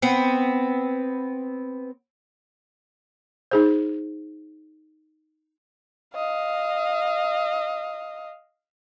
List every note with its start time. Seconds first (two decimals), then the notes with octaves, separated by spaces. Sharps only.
0.02 B3 C4
3.51 D#4 G#4 C5
6.15 D#5 F5